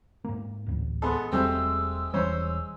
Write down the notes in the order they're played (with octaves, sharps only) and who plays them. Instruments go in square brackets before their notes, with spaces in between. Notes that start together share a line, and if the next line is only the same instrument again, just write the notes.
[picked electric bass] G#2 A#3
D1 A1
[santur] G#3 [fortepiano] B3 A4
[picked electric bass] E1 F#3 G3 [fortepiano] A3 C4 G4 [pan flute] E6
[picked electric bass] E1 E3 G3 [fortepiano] C#4 C5